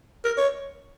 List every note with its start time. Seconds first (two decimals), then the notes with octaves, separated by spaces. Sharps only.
0.25 A#4
0.37 C#5